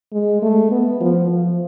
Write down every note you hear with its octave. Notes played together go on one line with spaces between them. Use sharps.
G#3
A3
B3
F3
F3